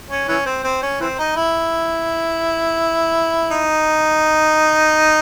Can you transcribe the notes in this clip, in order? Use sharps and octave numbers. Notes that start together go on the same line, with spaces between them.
C#4
E3 C#4
C4
C4
C#4
E3 C4
D#4
E4
D#4